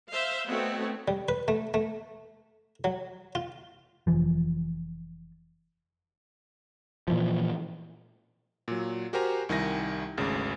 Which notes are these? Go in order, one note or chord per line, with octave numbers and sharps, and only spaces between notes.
C5 E5 F5
A3 B3 C4 D#4 F#4 C#5
G3
B4
A3
A3
F#3
F4
F1 D2 E3 F3
A#2 E3 F3
A#2 F#3
F#4 G4 A#4 C5 G#5 A#5
C2 D#3 E4 G#5 A#6
G#1 D2 C#3